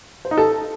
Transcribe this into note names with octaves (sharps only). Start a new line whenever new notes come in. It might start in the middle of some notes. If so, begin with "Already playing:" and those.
C5
D#4
A4